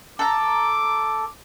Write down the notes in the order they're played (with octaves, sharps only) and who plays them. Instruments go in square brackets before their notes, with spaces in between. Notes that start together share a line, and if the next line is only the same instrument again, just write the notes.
[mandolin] A4 A#5 [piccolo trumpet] D6